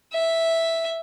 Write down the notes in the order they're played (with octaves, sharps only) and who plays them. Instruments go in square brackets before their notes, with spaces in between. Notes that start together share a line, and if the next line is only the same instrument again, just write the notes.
[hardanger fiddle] E5